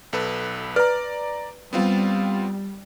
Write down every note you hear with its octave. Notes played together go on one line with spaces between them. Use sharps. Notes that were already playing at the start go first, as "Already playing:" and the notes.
B1 A4 B4
B4 D5 A#5
G3 B3 C4 F4